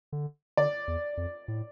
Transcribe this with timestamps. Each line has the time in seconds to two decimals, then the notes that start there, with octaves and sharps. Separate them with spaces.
0.12 D3
0.57 D3 D5
0.88 E2
1.17 F2
1.48 A2